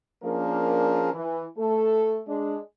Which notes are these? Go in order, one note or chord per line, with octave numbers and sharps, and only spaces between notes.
F3 A#3 C#4 D4 G#4 A#4
E3
A3 A4
G#3 D4